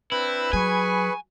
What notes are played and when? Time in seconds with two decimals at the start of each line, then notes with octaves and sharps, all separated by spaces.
0.12 C4 D4 E4 B4 C5
0.53 F#3 G#4 G#5 B5 C#6